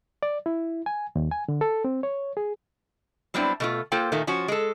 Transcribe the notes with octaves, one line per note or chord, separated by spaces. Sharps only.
D5
E4
G#5
D#2
G#5
D3
A4
C4
C#5
G#4
F#3 G3 B3 C4 D4 E4
B2 A3 F4
A#3 F4 A4 C5 G5
A#2 D#3 A3 A#3
F3 C#4 F#4
G#3 A4